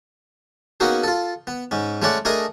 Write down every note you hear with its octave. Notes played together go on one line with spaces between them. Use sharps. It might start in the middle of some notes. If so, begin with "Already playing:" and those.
A#3 B3 C#4 D#4 F#4 G#4
F4 A4
B3
G#2 C#4
G#3 A3 C#4 C#5 D5 F#5
A3 D4 G#4 A#4 D#5 G#5